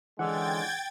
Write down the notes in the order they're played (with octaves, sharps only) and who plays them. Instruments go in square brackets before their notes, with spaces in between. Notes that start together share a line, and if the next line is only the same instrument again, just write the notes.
[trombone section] C#2 D3 G#3 [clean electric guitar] E3 [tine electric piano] F#5 [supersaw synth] G5 G#6 A6